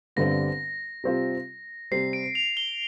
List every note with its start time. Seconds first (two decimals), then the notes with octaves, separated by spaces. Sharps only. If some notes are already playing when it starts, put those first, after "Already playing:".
0.16 G1 G2 D3 G3 C4 A#6
1.04 C3 G3 C4 F4
1.91 C3 G3 C4 C7
2.13 D7
2.35 F7
2.57 G7